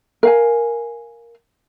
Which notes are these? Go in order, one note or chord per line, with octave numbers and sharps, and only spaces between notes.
A#4 F5 G#5